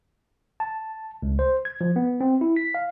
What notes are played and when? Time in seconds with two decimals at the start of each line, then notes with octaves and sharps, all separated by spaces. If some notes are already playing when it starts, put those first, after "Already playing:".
0.60 A5
1.22 C#2
1.39 C5
1.65 G#6
1.81 F3
1.96 B3
2.21 C4
2.41 E4
2.56 B6
2.75 F5